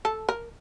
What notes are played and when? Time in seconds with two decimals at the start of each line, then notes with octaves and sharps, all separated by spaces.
0.05 A4
0.29 A#4